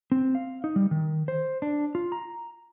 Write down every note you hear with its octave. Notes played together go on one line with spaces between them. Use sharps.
C4
F5
D#4
G3
D#3
C5
D4
F4
A#5